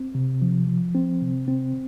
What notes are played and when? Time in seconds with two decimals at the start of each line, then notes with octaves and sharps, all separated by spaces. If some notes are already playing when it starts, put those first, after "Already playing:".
Already playing: C4
0.15 C3
0.42 F3
0.67 F3
0.95 C4
1.21 C3
1.48 C4